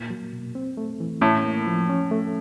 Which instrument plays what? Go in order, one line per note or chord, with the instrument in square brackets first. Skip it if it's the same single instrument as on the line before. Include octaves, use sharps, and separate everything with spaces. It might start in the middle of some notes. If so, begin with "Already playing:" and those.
Already playing: [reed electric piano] A#2 A#3
F#3
B2
C4
A3
E3
[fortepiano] A2 [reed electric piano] C#4
[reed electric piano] A#3
F3
C#4
A3